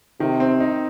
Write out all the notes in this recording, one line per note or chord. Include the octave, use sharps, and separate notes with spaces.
C3 D#3
C4
D#4